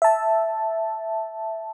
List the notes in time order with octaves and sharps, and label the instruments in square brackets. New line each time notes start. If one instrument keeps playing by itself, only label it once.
[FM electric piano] E5 A5